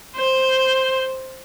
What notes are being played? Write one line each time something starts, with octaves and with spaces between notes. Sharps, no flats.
C5